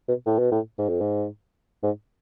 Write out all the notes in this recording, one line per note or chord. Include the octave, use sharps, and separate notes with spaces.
B2
A2
B2
A2
G#2
F2
G#2
G#2